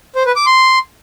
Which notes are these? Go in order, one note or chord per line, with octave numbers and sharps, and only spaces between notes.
C5
B4
D6
C6